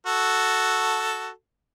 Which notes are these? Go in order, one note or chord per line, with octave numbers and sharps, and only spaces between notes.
F#4 A4